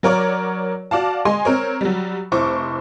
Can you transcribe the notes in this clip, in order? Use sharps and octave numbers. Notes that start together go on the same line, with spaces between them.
F#3 A#4 C#5 D5
F#4 D5 F5 A5
G#3 G#5 C6
C4 A#4 C#5
F#3 G3
F1 E4 C5 C#6 D6